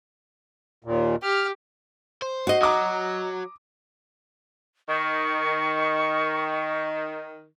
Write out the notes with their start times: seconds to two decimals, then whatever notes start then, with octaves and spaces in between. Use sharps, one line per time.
0.84 D#2 A#2
1.23 G4 F6
2.22 C5
2.47 F#4 D#5
2.61 F#3 A#5 D6 D#6
4.88 D#3 C#6